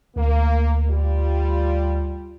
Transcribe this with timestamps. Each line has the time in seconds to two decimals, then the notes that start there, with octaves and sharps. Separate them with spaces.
0.16 D2 A#3
0.89 G3 F4